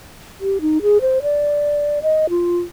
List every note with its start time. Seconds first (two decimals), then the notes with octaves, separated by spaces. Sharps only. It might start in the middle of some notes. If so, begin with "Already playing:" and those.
0.41 G4
0.61 D#4
0.82 G#4
1.01 C5
1.22 D5
2.03 D#5
2.29 F4